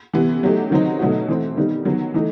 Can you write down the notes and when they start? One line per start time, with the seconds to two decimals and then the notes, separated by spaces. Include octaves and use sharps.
0.13 C3 E3 B3
0.43 F#3 A3 D#4 G4
0.71 D#3 F#3 C4 D#4
0.99 B2 F#3 A3 D#4 F#4
1.29 E3 A3 C4
1.57 D#3 G3 B3 D#4
1.85 D#3 F#3 B3
2.14 E3 A3 D#4